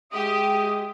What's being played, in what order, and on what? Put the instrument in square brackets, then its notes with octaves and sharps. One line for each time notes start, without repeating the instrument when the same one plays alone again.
[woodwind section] G#3 E5 D#6 [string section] G4